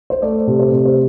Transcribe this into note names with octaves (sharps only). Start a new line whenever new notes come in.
C5
A3 D5
C3
C5
C3
C5